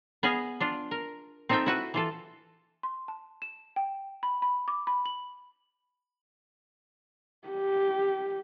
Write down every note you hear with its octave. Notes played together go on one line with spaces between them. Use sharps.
B3 G#4 B4 D#5 F5 G#5
D4 F4
A#4
C4 D#4 F4 A4 E5 G5
E4 F#4 B4
E3 F4 A4
C6
A5
E7
G5
B5
B5
D6
B5
F#7
G4